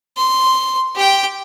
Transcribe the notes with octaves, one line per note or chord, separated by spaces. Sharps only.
C6
G4 G5